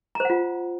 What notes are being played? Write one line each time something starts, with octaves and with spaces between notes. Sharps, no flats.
F4 C5 F#5 A#5